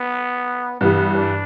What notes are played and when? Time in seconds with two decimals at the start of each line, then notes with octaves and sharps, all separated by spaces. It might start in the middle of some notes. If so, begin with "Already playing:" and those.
Already playing: B3
0.81 G2 E3 G3 B3
1.15 D4